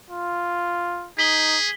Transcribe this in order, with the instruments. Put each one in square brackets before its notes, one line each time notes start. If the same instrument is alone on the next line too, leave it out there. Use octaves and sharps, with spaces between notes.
[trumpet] F4
[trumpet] D#4 [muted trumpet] G#4 [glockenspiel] B6 F#7 G7